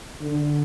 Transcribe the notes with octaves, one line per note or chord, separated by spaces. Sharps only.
D3